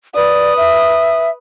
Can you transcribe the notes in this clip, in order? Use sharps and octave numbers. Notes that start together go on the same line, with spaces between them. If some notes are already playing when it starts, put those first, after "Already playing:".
B4 D5 D#6
E5